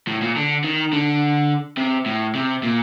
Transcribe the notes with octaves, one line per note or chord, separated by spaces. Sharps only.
A2
A#2
D3
D#3
D3
C3
A2
C3
A#2